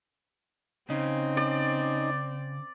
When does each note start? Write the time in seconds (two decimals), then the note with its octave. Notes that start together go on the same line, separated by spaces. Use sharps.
0.90 C#3 C4 C#4 D#4 D#5
1.37 D5